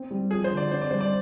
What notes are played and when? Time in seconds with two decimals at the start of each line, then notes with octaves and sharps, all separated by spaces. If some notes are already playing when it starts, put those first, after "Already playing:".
Already playing: C4
0.11 G3
0.30 F3 G#4
0.44 C5
0.50 D3
0.57 D5
0.71 C4 C5
0.81 D5
0.91 G3 C5
1.00 D5